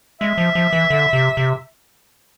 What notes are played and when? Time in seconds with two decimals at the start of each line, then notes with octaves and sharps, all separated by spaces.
0.21 G#3 E5
0.38 F3
0.55 F3
0.73 E3
0.90 D3
1.13 C3
1.37 C3